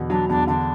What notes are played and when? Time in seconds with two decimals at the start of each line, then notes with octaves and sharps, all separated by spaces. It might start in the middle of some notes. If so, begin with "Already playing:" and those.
Already playing: E2 B2 D3
0.10 F#3 D4
0.29 E2 D4
0.47 D3 D4